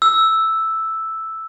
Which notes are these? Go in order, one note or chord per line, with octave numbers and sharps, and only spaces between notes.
E6